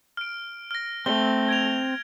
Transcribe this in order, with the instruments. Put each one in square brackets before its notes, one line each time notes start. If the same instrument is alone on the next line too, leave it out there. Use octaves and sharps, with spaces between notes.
[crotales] F6 D7
F6 A#6
[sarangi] A3 [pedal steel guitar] C4 [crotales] G7
[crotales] G#6 D7 F7